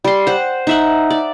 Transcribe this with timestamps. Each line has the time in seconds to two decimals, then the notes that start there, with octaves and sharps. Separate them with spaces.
0.04 G3 C6
0.27 C5 F#5
0.67 D#4 E5 F#5
1.11 D5